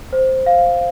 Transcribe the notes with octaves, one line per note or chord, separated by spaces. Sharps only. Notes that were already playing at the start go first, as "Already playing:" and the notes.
C5
F5